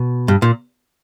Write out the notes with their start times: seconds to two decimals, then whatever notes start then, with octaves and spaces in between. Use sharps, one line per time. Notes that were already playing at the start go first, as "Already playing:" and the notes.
Already playing: B2
0.28 G2
0.42 A#2